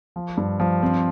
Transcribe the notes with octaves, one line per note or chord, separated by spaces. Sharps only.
F3
G2
F3
C4